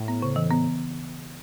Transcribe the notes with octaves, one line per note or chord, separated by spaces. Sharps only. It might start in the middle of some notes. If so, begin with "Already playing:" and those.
Already playing: A2
B3
C#3
E3
B3